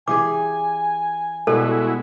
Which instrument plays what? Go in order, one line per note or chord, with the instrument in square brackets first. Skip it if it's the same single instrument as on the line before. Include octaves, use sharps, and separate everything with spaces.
[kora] E3 G4 G#4 [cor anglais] G#5 [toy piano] D6
[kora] B2 G3 [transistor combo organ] G#3 E4 F#4 [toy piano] A4